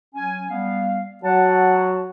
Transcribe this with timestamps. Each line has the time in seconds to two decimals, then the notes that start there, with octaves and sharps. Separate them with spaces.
0.15 F#3 C#4 G#5
0.50 G3 B3 F5
1.24 F#3 F#5 A5